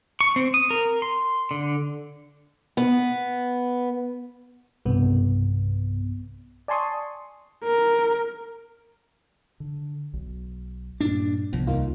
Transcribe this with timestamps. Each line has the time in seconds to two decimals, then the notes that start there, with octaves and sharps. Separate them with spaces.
0.21 C#6
0.36 C4
0.54 D#6
0.71 A#4
1.02 C6
1.51 D3
2.77 B3
4.85 B1 G2 C3 B3
6.68 D5 G#5 A5 C6 C#6 D#6
7.64 A#4
9.60 D3
10.13 B1
11.01 G2 A#2 D4
11.53 C2 A2 F3 B3
11.67 D#2 A#3 D#4 F4